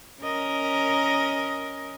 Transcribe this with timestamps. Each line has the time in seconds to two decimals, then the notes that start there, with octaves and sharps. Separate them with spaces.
0.21 C#4 A#4 D#5